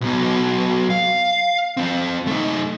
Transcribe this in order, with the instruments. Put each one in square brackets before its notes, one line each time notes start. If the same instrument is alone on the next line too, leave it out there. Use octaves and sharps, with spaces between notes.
[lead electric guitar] B1 B2
F5
F2 C4
A3 D#4